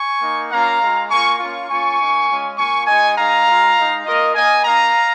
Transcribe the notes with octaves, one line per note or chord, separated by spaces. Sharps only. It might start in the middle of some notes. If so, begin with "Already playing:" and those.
Already playing: G#5 C#6
A#3 D#4
A#3 C#4 F4 F5 A#5
G#3 F4
A#3 F4 G#5 C#6
A#3 C#4 F4
A#3 C#4 F4 G#5 C#6
A#3 D#4
G#3 C#4 F4
A#3 F4 G#5 C#6
G#3 D#4 D#5 G#5
G#3 D#4 F5 A#5
G#3 F4
G#3 D#4
A#3 F4 A#4 D#5
A#3 D#4 D#5 G#5
A#3 D#4 F5 A#5